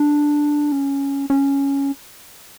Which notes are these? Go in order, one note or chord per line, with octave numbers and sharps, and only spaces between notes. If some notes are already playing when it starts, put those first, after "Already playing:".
Already playing: D4
C#4
C#4